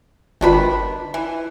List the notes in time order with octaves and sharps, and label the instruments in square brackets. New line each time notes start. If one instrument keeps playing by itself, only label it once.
[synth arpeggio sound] G1 F4 B4 [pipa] D#3 D4 B5
[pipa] E3